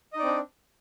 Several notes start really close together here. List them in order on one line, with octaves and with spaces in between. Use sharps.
D#5 D#4 D5 C4 D4